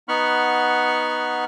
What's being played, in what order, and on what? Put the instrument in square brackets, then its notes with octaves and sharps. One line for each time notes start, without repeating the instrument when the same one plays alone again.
[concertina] B3 D#4 F#5 B5 C#6 F6